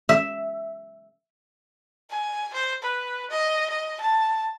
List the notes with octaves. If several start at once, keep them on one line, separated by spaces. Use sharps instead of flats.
E5
G#5
C5
B4
D#5
D#5
A5